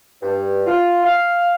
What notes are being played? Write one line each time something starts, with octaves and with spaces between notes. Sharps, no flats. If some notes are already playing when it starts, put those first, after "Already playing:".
G2
F4
F5